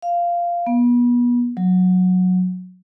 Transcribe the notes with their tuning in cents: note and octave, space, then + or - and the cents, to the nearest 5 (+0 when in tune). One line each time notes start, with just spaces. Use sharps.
F5 -10
B3 -30
F#3 -15